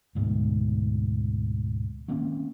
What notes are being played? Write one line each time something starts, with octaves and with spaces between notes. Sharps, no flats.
D2 G#2 B2
D#3 A#3 C4 C#4